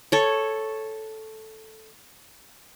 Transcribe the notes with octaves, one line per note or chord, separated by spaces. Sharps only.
A4 C#5